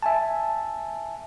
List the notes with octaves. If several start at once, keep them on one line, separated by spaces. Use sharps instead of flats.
E5 G#5 A5